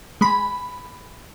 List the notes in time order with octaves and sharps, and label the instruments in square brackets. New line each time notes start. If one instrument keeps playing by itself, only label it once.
[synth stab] G#3 B5